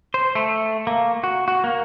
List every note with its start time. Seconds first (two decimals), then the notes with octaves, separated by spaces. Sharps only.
0.14 C5
0.35 A3
0.87 A#3
1.24 F#4
1.48 F#4
1.64 A#3